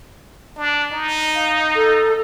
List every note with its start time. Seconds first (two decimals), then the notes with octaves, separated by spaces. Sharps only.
0.57 D4
0.92 D#4
1.35 F5
1.75 A4